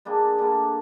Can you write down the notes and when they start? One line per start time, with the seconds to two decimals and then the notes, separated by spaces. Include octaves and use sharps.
0.05 G3 A#3 D4 G#4
0.38 D3 G3 A#3